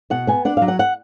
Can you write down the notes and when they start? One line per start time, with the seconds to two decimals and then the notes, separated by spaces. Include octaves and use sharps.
0.10 B2 F#5
0.27 B3 G#5
0.45 D4 F#5
0.57 F#3 F5
0.68 F#5
0.79 F#5